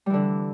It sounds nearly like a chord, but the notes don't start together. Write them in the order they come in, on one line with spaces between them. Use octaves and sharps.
G3 E3 D3